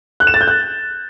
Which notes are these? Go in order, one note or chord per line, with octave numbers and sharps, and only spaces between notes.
F#6
E7
A6
G6
F#6